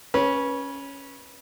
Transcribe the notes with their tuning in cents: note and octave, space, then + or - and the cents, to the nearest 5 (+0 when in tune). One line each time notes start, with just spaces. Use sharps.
C#4 +0 B4 -25